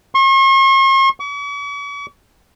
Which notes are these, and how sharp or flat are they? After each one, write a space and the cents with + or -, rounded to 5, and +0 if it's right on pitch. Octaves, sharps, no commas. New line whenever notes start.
C#6 -45
C#6 +45